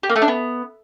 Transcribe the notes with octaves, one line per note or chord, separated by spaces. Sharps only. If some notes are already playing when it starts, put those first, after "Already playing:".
G4
A#3
A3
D4
B3